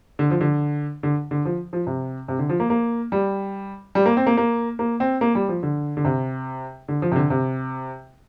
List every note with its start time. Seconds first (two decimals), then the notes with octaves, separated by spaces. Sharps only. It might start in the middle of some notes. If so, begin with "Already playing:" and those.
0.19 D3
0.30 F3
0.41 D3
1.03 D3
1.31 D3
1.45 F3
1.73 F3
1.87 C3
2.28 C3
2.39 D3
2.49 F3
2.60 A#3
2.70 A#3
3.12 G3
3.95 G3
4.06 A#3
4.17 C4
4.26 A#3
4.37 A#3
4.79 A#3
5.00 C4
5.21 A#3
5.35 G3
5.49 F3
5.63 D3
5.97 D3
6.05 C3
6.88 D3
7.02 F3
7.12 C3
7.16 D3
7.30 C3